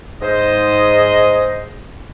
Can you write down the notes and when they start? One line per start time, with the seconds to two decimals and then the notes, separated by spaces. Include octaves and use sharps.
0.22 G#2 C5 D#5